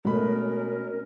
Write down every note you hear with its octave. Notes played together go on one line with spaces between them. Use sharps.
B2 G#3 A3 C#4 F#4 A#4 B5